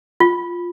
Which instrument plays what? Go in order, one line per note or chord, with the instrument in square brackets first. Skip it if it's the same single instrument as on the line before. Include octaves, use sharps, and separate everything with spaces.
[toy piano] F4